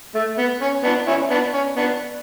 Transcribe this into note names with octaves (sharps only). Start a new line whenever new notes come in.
A3
B3
C#4
B3 D4
C#4 E4
B3 D4
C#4
B3 D4